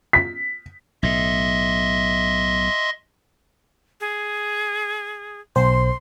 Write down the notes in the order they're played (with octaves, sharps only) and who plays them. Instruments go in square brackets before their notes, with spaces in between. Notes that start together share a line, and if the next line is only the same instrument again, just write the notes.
[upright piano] B6
[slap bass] B1 A2 [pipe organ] D#5 E5 C6
[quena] G#4
[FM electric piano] B1 C5 [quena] C6